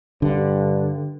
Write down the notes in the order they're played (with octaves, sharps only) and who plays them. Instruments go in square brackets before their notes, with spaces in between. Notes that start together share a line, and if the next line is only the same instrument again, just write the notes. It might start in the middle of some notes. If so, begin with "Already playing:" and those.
[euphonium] G2 [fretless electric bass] D3